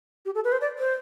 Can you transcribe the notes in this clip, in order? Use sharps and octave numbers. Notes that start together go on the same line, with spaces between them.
G4
A4
B4
C5
D5
C5